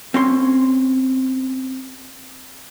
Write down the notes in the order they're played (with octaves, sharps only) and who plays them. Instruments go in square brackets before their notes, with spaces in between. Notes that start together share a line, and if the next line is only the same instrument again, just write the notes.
[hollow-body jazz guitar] C4 C#4 C6